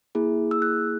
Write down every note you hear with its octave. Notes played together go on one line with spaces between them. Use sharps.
A#3 E4 G#4
E6
F#6